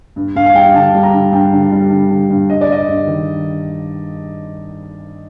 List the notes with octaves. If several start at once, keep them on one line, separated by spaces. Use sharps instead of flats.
G2
G2 F5
F5
G3 G5
D3 A5
G3
A#5
D3
G2 G5
D3
G3
D3
D3
G2
G2 D#5
D5
G2 D#5
G2
D#3